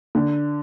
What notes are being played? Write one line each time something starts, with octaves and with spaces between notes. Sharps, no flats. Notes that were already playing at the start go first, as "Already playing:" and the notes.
D3